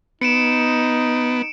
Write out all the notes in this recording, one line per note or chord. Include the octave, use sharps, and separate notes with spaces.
B3 D#4 C#7 D7 E7